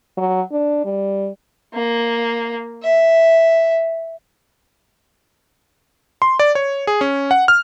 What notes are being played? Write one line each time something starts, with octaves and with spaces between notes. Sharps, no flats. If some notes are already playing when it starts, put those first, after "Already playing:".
F#3
D4
G3
A#3
E5
C6
D5
C#5
G#4
C#4
F#5
F6